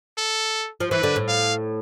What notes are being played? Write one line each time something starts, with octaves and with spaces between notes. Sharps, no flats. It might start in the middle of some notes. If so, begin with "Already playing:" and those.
A4
F3
E3 B4
D3
A2
F5